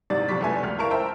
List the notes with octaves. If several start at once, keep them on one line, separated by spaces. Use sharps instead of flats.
F#1 E2 G#2 C3 D5 A6
B1 F2 G3 C#6 D6 B6
F1 F#2 A3 B3 G#5
C#2 F6
E4 A#4 F5 A5 C#6 D7
C5 E5 G5 A5 A#5